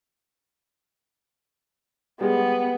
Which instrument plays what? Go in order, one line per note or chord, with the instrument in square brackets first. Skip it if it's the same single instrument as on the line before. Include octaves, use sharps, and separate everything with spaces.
[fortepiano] G3 G#3 [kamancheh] B3